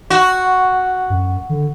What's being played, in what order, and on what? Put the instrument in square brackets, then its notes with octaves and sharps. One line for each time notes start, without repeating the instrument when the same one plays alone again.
[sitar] F#4
[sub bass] F#2
D3